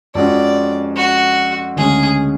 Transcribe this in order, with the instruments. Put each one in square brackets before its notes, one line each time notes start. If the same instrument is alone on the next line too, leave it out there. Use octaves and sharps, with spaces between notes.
[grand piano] F2 F3 G#3 C#4 F#4 [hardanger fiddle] D5
[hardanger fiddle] F#4
[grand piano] D2 C#3 G#3 C#4 [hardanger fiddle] G#4